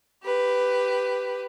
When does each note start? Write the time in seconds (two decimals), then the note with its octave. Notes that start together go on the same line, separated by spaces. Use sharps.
0.23 G4 B4